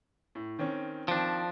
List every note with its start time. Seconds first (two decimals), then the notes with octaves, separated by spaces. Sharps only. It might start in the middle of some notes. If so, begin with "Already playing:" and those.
0.35 A2
0.59 D#3 C4 C#4
1.08 D#3 F3 C4 D4 D7